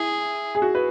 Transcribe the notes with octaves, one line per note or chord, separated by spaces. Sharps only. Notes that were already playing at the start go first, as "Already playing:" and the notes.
Already playing: E4 G#4
G#4
F#4
B4